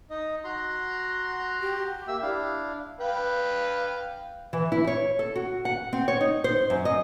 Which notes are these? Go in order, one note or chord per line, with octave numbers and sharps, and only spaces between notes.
D#4 D#5
F#4 A#5 C6
G4
A#3 E5 E6
D4 E4 F5
B4 F5 G5
E3
E4
C#5
A4
F#4
F#5
C4
C#5
D#4
C5
F#2
D#5